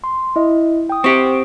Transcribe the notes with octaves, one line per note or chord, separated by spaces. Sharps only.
C6
E4 D#5 E5
G5 D#6
C4 G4 F#5 C#6 D#6